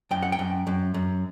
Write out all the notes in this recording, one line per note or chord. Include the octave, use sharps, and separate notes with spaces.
F#2 G5
F#5
G5
F#2
F#2
F#2